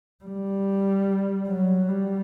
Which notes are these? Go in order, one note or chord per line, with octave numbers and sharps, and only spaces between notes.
G3
F#3
G3